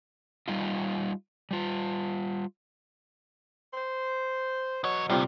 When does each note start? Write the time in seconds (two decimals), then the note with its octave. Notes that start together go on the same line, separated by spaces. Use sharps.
0.48 G3 D#4 F4
1.51 G3 F4
3.73 C5
4.84 E2 B2 F#3 C#5
5.09 A2 C3 G3 C4 F4